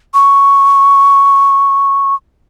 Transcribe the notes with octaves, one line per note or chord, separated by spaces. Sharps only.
C#6